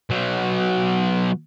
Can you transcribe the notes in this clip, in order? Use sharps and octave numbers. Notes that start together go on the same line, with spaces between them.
B2 F#3